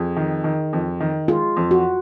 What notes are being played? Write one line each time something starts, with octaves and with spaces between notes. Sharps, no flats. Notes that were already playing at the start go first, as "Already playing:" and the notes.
Already playing: F2 G#4
D#3
D#3
F2
D#3
G#3 F4
F2
F#4